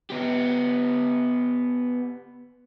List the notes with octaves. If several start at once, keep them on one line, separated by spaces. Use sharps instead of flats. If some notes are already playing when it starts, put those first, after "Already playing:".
B3 G4